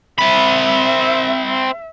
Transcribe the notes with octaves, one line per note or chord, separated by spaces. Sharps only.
C4 E5 B5